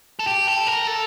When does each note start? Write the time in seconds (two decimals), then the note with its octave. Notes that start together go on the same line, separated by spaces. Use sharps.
0.19 A4
0.27 G4
0.47 A4
0.67 A#4
0.87 A4